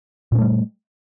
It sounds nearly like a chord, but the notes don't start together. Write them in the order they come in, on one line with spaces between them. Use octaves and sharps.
A#2 C#4 A3 G3